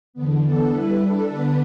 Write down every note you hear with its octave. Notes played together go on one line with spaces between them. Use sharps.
E2 D3 B3
E3 B3 D4 A4
G3 E4 B4
G3 D4 A4
D3 B3 D4 B4